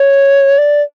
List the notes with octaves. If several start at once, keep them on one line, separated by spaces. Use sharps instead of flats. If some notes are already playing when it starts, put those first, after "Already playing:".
Already playing: C#5
D5